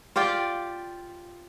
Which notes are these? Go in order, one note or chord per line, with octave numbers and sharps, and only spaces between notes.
F4 G4 D5 G5